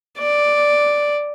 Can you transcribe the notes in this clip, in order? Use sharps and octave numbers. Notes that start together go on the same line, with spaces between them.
D5